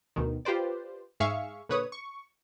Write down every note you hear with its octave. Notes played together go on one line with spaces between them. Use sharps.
D2 B2 D#3
F4 G4 B4 C5 D5
G#2 G#4 E5 F5 C#6
A#2 D3 B4 C#5 D#6
C#6